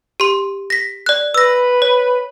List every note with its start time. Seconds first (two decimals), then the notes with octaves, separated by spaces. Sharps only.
0.20 G4 C6
0.70 A#6 B6
1.06 D5 F#6
1.34 B4 E6 A#6
1.82 C#5